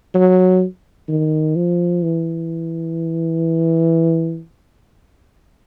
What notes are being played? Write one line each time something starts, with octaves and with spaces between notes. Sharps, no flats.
F#3
D#3
F3
E3